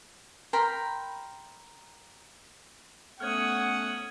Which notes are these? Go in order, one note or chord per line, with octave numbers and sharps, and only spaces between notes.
A#4 G5 B5 C6
A3 B3 C#4 C#5 F#5 D#6 F6 G#6